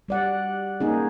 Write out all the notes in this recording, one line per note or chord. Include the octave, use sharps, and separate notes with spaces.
G3 D5 F#5
A#3 C#4 D#4 G#4